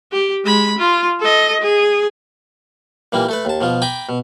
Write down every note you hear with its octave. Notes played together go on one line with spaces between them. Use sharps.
G4
G#3 B5
F4
A4 D#5
G#4
A#2 E3 G3 A#3
A3 A4 B4
D#2 A5
B2 F3 F4
G5 G#5 A#5 B5 D6
B2